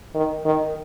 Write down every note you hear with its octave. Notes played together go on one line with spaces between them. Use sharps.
D#3
D#3